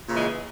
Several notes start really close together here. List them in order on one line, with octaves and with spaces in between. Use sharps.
A#2 C#3 E3 G#3